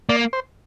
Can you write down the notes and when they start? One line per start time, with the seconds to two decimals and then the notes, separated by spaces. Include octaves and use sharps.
0.09 A#3 D5
0.33 C5